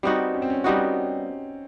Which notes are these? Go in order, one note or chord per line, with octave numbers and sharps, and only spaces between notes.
G3 B3 C4 D#4 F#4
C#4
C4
C#4
G3 B3 D#4 F#4